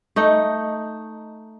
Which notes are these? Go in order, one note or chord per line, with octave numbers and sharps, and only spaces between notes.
A3 D#4